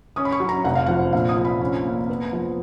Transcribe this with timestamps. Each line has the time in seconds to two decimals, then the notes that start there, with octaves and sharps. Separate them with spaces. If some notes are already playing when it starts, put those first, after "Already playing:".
0.16 C#4 D#6
0.25 B5
0.32 C#6
0.40 F#3
0.49 A#5
0.64 F1 F#5
0.75 F5
0.86 F3 F#5
1.13 A#1 F5
1.29 D#6
1.37 F3
1.45 B5
1.61 C#4
1.85 A#3
2.09 B3
2.33 F3